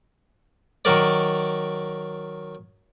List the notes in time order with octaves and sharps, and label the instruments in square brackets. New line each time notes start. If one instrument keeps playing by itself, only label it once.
[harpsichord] D#3 F#3 A#4 D5